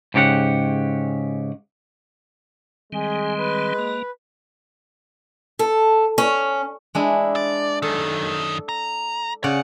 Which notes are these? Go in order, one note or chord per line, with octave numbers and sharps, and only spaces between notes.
G#2 C#3 G4 A4 F#5
D#3 G3 G#3 C4 G#4
B4
A#3
A4
C#4
G#3 D4 E4
D5
F#2 D#3 A4
A#5
C#3 C#5 D5 F#5